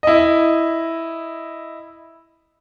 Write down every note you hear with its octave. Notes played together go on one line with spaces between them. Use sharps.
E4 D#5